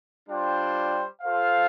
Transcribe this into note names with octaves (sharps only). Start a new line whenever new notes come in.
G3 D4 F4 C5 G5
F4 A4 C5 F5